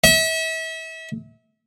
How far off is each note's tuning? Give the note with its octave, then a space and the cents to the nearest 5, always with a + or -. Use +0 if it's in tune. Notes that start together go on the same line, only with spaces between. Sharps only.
E5 -35